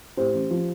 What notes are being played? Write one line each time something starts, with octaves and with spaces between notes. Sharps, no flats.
A2 G4 C5
A1
F3